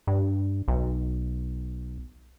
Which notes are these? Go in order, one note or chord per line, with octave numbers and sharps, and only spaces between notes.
G2
B1